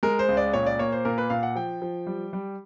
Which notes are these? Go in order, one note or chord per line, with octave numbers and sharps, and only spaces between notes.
G#3 A#4
C5
C#2
D5
A#2 C#5
D5
A#3 C#5
C5
A#2 A#4
B4
A#2 F5
F#5
F3 G5
F3
G3
G3